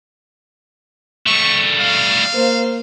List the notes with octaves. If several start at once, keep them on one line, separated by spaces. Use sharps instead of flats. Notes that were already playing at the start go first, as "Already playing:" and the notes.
G3 A3 C#6
F5
A#3 C5